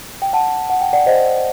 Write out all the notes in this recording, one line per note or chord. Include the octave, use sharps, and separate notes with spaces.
G5
F#5 A5
F#5
G5
D5 F#5
C5 D#5